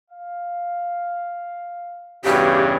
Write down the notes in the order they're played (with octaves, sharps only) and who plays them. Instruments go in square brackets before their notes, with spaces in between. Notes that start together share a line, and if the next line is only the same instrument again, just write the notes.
[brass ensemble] F5
[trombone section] E2 G2 C#3 [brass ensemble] F#4 [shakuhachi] G4